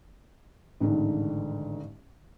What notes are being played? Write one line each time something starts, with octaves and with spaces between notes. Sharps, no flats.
A1 G#2 D3 D#3